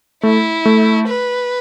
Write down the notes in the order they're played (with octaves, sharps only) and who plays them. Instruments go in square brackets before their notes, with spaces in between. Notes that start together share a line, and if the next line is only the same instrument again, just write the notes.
[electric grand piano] A3 [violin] E4
[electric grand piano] A3
[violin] B4